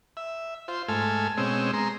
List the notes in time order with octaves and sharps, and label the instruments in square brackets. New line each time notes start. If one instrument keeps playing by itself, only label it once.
[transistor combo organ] E5
F4 C5
G#2 A3 A4 G#5 F6
B2 G#3 C4 C#4 E6
G#3 A#5 C6